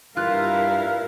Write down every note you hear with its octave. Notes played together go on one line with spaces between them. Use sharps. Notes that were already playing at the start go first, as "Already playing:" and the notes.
G2 E4 F4 A#4 F5 F#6